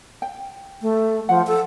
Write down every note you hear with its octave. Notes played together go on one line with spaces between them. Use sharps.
G5
A3
F3 F#5
A4